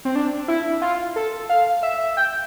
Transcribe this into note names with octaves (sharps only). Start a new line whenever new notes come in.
C4
D4
E4
F4
A4
F5
E5
G5